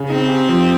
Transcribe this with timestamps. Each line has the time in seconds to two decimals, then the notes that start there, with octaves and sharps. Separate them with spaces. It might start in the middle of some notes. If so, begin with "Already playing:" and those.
Already playing: C#3
0.09 C4 D#4
0.29 G4
0.49 F3